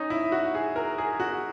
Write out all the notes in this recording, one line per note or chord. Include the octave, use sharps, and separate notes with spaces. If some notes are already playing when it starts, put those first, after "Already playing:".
Already playing: C#4 D#4
E4
F#4
G#4
A#4
G#4
F#4